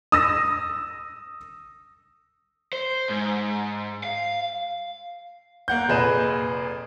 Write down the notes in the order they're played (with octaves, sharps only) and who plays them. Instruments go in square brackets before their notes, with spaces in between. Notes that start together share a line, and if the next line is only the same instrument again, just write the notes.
[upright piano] D#6 E6 A#6
[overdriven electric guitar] C5
G#2
F5
[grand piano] A#3 F#5 G6
F1 A#2 G#4 B4 D#5 E7